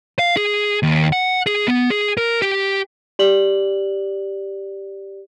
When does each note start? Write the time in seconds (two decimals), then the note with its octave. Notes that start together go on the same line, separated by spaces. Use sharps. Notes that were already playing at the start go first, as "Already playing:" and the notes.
0.19 F5
0.36 G#4
0.83 D#2
1.13 F#5
1.46 G#4
1.68 B3
1.90 G#4
2.18 A#4
2.42 G4
3.19 G4 D5 F#7